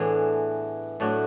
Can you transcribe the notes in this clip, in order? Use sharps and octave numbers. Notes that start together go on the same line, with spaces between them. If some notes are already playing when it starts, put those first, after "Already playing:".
Already playing: A2 E3 B3 D4 G#4
A2 F#3 A3 D4 F#4